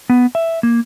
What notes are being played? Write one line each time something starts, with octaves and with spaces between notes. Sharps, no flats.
B3
E5
A#3